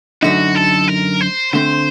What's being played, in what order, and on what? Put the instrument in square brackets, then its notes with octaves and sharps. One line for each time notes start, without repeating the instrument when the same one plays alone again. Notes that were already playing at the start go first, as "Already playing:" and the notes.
[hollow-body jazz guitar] F#2 D3 A3 D#4 [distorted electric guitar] F#4
[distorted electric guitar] A4
A#4
C5
[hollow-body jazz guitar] D3 A3 C4 [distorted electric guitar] C5